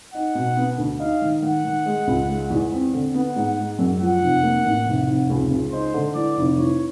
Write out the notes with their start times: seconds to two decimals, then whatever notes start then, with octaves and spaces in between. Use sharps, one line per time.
0.14 D#4 F#5
0.35 B2
0.57 B3
0.78 D2
1.00 D#4 F5
1.22 D#3
1.42 D#3 F#5
1.64 D#3
1.86 G#3
2.07 C#2
2.28 G#3
2.51 E2
2.72 C4
2.93 D3
3.14 B3 F#5
3.36 G#2
3.58 G#3
3.79 F#2
4.01 F3 F#5
4.21 F1
4.43 A#3
4.65 A1
4.86 F1
5.08 F1
5.30 C#2
5.51 C#2
5.72 D#4 C5
5.94 D3
6.15 E3 D5
6.36 F1
6.58 E3 C#5